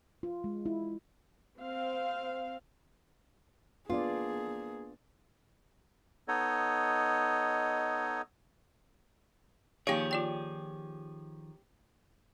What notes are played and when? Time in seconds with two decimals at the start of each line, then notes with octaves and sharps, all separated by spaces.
0.23 F4
0.44 G#3
0.66 E4
1.59 C4 F5
3.90 A#3 B3 D4 F4 G#4 D5
6.28 B3 D#4 A4 C#5 D#5
9.87 D#3 F3 A#3 D#4 G4 G#4 C#5 F5
10.11 F4 D5 G5